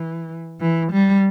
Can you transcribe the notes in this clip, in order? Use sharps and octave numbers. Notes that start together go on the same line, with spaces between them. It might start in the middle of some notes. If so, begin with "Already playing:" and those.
Already playing: E3
E3
G3